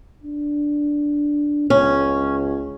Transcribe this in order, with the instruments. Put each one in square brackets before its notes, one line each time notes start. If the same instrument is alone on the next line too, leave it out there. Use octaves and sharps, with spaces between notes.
[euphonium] D4
[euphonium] C#2 [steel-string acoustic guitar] C#4